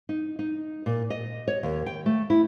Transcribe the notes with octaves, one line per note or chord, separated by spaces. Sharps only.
D#4
D#4
A#2
D#5
C#5
D#2
G5
A3
E4